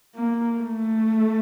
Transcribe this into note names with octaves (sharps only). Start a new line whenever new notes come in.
A#3
A3